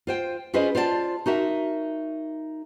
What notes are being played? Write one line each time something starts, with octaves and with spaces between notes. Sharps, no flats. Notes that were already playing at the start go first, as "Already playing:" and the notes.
F4 C5 G5
C#4 F4 G#4 B4 C5 D#5
F4 C5 D5 F#5 A5
D#4 F#4 A#4 E5